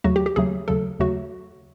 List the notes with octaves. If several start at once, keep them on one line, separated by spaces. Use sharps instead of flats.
D#2 C#3 F#3 A3 F#4
G4
G4
D#2 C#3 F#3 A3 G#4
D#2 C#3 F#3 A3 A4
D#2 C#3 F#3 A3 F#4